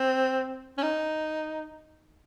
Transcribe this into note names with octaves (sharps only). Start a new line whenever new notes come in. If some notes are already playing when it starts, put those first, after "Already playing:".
Already playing: C4
C#4
D#4